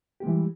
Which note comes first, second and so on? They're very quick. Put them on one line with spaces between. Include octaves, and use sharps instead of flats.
G4 G#3 E3 G3